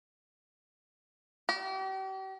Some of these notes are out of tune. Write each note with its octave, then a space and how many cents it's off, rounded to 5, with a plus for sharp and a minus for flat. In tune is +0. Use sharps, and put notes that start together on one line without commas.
G4 -40